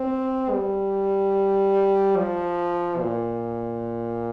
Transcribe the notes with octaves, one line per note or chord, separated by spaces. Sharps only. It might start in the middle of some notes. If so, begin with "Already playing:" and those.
Already playing: C4
G3
F3
A#2